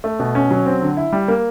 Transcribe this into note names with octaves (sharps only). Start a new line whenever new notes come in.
A3
B2
C#4
F#3
C4
D3
E4
G3
A#3